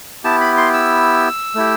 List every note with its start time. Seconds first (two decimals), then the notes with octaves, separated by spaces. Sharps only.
0.24 B3 E4 G4 A5
0.41 B5
0.57 C6
0.74 E6
1.55 A3 E4 G4